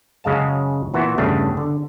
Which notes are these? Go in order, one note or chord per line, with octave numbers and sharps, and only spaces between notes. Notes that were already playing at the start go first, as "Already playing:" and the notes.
F#2 C#3 G#3 F5 A5
A#2 E3 B3 F#4 E5
E2 G2 C#3 A3 D4
D3